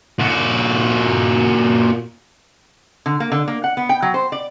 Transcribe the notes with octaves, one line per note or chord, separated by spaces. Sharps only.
A#2 F#4
D3
A#3
D3
A#3
F#5
B3
G5
F#3
C5
D5